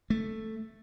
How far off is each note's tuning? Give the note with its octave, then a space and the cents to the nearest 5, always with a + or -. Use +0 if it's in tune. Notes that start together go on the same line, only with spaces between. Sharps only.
A3 +0